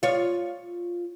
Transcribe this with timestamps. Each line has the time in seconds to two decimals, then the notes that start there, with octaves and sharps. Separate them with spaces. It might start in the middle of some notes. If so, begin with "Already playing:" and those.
0.03 F4 C#5